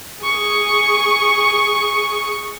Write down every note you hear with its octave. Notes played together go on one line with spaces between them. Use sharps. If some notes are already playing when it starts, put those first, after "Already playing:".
G#4 C#6